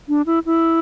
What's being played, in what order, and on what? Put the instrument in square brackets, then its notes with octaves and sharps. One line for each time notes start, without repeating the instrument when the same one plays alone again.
[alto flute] D4
E4
E4